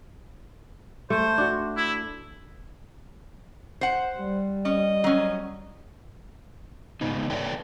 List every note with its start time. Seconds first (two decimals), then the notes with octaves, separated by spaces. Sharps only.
1.10 A3 C5
1.38 D4 F#4
1.77 E4
3.81 C5 F#5
4.18 G3
4.65 C#4 D#5
5.04 F#3 C#4
7.01 G#2 C#3 B3 D#4
7.30 A4 B4 C#5 D5 G5